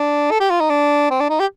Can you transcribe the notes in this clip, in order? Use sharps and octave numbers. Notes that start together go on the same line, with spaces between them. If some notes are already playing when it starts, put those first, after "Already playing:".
Already playing: D4
A4
G4
F4
D#4
D4
C4
D4
D#4
G4